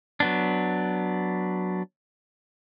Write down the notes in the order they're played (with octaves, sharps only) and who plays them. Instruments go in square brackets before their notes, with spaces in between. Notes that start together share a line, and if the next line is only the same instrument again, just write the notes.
[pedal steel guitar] F#3 B3 D4